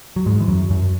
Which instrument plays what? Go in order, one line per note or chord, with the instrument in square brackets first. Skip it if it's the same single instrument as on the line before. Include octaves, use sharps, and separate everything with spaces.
[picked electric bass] F#3
G#2 G#3
E3
F#2 F#3
F#2 F#3